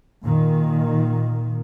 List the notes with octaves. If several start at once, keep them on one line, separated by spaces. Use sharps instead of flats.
A#2 D#3